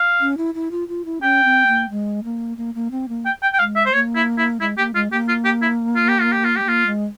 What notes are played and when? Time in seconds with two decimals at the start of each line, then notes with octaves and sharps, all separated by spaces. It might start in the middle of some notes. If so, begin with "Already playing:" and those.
Already playing: F5
0.21 C#4
0.37 E4
0.54 E4
0.71 F4
0.88 F4
1.05 E4
1.22 C#4 G5
1.44 C4
1.67 A#3
1.90 G#3
2.24 A#3
2.57 A#3
2.75 A#3
2.91 C4
3.09 A#3
3.26 G5
3.43 G5
3.53 G5
3.59 G#3 F5
3.76 E5
3.86 C5
3.93 A#3 C#5
4.15 E4
4.38 E4
4.61 G#3 E4
4.78 A#3 G4
4.94 G#3 F4
5.12 A#3 G4
5.28 F4
5.45 G4
5.62 E4
5.96 F4
6.08 G4
6.21 F4
6.32 G4
6.45 F4
6.56 G#3 G4
6.64 A#3 F4
6.86 G#3